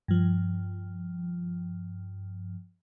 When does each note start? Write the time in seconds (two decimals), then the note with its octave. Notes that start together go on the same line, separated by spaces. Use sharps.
0.08 G2 F3